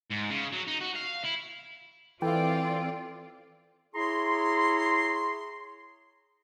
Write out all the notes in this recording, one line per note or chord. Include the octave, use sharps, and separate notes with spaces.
G#2
C#3
F#3
D#4
F#4
F5
E4
E3 C4 F4 A4 D5 G5
E4 G#4 C#5 A#5 C6